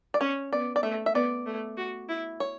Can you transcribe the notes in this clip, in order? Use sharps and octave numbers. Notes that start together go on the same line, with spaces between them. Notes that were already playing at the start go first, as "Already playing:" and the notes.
D5
C#4 C#5
B3 D5
D5
A3 E5
E5
B3 D5
A3
F#4
E4
C#5